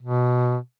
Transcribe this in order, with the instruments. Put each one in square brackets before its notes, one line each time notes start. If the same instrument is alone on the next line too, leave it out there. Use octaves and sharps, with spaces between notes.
[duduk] B2